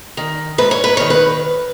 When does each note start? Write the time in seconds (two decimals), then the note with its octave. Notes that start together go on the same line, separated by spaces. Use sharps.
0.17 D#3
0.58 G#2 B4
0.71 C#5
0.84 B4
0.97 D#3 C#5
1.10 B4